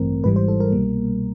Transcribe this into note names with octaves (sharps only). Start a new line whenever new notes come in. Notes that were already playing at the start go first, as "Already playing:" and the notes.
Already playing: A1 G2 E3 A3 C4 A#4
G#1 G#2 E3 G3 B4
C5
A4
A#4
C2 B2 G3 A#3